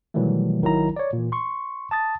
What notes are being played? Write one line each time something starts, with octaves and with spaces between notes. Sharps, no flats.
B2 D#3 E3 F#3 G3 A3
G#1 D#3 F#3 E4 A#5
C#5 D5
A#2 E3
C6 C#6
A5 D#6 A6